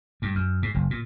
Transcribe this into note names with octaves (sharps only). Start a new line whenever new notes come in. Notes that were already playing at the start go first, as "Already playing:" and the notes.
G2
F#2
G#2
F#1
A#2